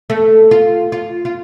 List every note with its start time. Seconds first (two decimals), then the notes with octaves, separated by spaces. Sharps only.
0.10 A3
0.51 F4
0.92 F4
1.25 F4